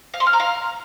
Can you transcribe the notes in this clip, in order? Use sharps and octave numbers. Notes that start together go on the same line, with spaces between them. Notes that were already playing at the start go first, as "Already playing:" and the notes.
F5
C6
F6
A#5
F5